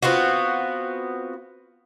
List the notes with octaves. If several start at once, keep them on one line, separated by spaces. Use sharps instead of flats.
B3 C4 F4 F#4